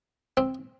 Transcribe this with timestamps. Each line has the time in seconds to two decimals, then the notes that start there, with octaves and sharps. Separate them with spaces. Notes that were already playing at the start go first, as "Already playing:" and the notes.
0.37 C4